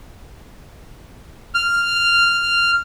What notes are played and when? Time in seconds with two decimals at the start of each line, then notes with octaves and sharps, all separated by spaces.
1.55 F6